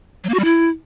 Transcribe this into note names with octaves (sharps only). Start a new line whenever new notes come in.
F#3
A#3
F#4
G3
E4